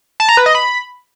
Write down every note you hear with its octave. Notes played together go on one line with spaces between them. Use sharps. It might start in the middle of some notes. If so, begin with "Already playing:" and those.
A5
A#5
B4
D#5
B5